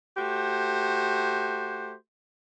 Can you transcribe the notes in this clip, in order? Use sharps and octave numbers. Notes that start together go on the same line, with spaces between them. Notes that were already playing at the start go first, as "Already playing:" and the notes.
A3 F#4 G4 C5